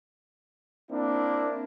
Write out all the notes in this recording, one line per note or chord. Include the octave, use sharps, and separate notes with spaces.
A#3 C4 D4 E4